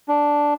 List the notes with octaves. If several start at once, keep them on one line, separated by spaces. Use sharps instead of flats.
D4